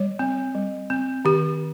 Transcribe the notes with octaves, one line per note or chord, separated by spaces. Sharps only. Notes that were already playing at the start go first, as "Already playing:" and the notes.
Already playing: G3 C#5
C4
G3
C4
D#3 G4